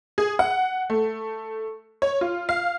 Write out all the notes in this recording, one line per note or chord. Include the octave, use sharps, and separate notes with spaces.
G#4
F#5
A3
C#5
F4
F5